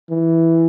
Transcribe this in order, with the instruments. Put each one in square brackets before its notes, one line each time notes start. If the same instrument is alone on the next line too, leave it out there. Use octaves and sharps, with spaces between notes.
[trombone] E3